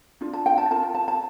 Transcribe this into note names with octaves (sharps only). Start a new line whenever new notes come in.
D4 F4
A5
G5
A5
F4 A#4 A5
G5
A5
A5